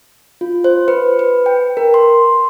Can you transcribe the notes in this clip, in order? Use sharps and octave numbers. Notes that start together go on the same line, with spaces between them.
F4
C5
B4
B4
G5
A#4
C6